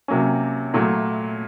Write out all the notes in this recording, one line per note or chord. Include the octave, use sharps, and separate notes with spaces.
C3 F#3 A#3 C#4
A#2 F#3 A3